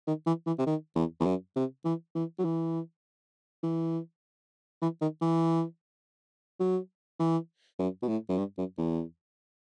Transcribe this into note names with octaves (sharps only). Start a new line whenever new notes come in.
D#3
E3
E3
C3
D#3
E2
E2
F#2
C3
E3
E3
F#3
E3
E3
E3
D#3
E3
F#3
E3
F#2
B2
A2
F#2
G2
F#2
E2